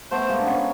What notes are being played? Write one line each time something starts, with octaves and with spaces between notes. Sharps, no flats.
A3 B3 C5
G#3 A#3
D4
B3 C#4